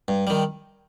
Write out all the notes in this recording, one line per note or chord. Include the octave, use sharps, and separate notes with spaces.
G2
D#3 G3